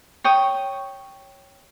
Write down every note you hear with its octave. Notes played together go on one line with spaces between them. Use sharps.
C#5 G5 D#6